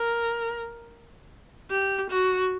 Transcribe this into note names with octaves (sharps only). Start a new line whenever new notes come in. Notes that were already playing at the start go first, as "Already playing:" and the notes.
Already playing: A#4
G4
F#4